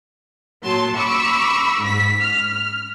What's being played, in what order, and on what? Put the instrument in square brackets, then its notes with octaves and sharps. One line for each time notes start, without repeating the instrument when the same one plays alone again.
[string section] A#2 F#3 A5 C6
B5 C#6 D6 E6
G#2 B6
F6